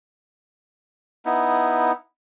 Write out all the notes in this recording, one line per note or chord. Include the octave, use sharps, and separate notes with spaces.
B3 D#4 E4